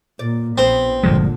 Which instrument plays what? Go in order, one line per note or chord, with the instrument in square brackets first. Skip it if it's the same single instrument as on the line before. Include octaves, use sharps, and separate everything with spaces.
[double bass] A#2 A#3 [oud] D5
[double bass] A#1 [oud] B3 C5 [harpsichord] C4
[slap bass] G1 F3 G#3 [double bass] A#2 D3